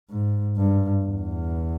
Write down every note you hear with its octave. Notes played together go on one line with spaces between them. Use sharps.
G#2
G2
E2